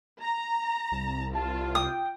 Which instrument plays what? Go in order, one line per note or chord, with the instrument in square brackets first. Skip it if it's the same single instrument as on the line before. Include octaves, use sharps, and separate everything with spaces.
[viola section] A#5
[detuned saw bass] C2
[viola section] F4 [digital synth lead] A5
[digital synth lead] G5 [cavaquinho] D#6